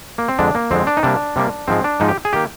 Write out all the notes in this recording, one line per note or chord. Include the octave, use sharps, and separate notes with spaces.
A#3
C4
F2 D3 G#3 D4
A#3
F2 D3 G#3 C4
D4
D#4
C3 G3 A#3 D4
C3 G3 A#3
G#2 F3 G#3 C4
D4
G#2 F3 G#3 D#4
G4
G#4
D#3 A#3 G4